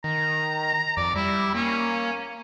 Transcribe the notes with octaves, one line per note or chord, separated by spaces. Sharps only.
D#3 A#5
F2 D5
G3 E4
A#3 C#4